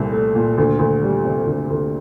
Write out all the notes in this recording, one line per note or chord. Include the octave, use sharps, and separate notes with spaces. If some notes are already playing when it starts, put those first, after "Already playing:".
Already playing: C2 A#2 A3 C4
A3
A#2
D2
D2
G3
C3
D2
D2